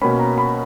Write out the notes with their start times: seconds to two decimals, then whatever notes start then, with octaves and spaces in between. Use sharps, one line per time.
0.02 B2 A#3 C#4 B5
0.19 A#5
0.38 B5